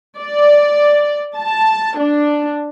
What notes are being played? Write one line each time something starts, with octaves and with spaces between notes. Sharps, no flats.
D5
A5
D4